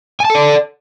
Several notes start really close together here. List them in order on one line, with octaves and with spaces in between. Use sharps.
G#5 A5 A4 D5